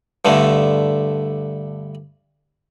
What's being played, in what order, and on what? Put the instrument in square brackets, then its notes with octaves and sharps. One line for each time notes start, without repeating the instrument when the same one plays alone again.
[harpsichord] G2 D3 A3